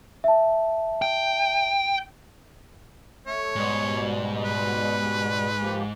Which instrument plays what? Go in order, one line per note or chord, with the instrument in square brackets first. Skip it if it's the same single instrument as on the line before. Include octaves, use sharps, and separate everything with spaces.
[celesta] E5 A5
[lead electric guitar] G5
[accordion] A3 [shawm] C#5
[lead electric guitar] G#2 [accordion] B2 G3
[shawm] B4
[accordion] F3 A#3 G4